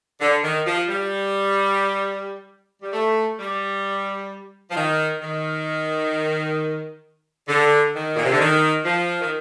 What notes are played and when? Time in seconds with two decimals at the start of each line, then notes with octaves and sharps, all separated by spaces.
0.20 D3
0.43 D#3
0.66 F3
0.89 G3
2.82 G3
2.93 A3
3.39 G3
4.70 F3
4.75 D#3
5.21 D#3
7.48 D3
7.94 D#3
8.15 A#2
8.22 C3
8.31 D3
8.39 D#3
8.85 F3
9.20 D#3